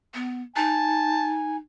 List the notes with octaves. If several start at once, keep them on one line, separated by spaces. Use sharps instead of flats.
B3
D#4 G#5 A5